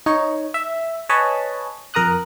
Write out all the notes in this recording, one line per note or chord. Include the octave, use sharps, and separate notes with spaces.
D#4 C#5
E5
B4 C#5 D#5 G#5 A5 B5
F2 A#4 A#5 D#6 F#6